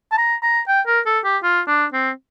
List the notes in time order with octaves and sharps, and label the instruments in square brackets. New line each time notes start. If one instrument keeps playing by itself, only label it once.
[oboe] A5
A#5
A#5
G5
A#4
A4
G4
F4
D4
C4